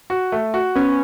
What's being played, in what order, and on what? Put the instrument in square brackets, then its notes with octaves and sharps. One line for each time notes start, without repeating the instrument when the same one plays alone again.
[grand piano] F#4
A3
F#4
[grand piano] B3 [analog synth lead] C#4